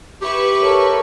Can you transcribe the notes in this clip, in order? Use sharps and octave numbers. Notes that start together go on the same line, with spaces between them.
E4 G4 B4 C#6
A4 A#4 C#5